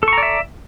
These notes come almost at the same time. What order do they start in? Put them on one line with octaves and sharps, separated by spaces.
A4 C#6 A#5 D5 E5